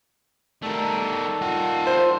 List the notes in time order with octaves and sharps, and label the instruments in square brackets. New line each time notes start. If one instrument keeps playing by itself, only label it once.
[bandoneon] D#3 G3 A4 [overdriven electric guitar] A3 A#4
[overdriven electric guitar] F4 F#5
[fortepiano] C5